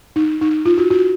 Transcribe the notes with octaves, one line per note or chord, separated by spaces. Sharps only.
D#4
D#4
F4
F#4
F#4